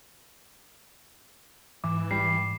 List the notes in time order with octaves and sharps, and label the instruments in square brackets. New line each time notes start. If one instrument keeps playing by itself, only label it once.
[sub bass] G#2 [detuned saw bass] E3 [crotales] D6
[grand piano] G3 [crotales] C7